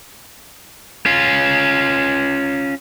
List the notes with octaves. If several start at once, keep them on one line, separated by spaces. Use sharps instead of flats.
C#4 F4